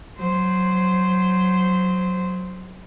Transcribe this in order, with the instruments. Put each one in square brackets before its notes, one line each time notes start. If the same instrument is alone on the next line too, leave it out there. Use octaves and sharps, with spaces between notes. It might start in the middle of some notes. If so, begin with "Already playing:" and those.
[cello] F#3 C5